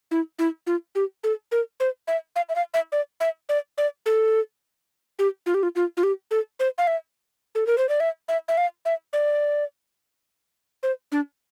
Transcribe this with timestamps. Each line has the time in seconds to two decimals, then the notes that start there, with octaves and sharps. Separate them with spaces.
0.11 E4
0.39 E4
0.67 F4
0.95 G4
1.24 A4
1.52 A#4
1.80 C5
2.08 E5
2.36 F5
2.49 E5
2.56 F5
2.74 E5
2.92 D5
3.20 E5
3.49 D5
3.78 D5
4.06 A4
5.19 G4
5.46 F4
5.54 G4
5.63 F4
5.76 F4
5.97 F4
6.03 G4
6.31 A4
6.60 C5
6.78 F5
6.87 E5
7.55 A4
7.67 A#4
7.78 C5
7.89 D5
8.00 E5
8.28 E5
8.48 E5
8.58 F5
8.85 E5
9.13 D5
10.83 C5
11.12 D4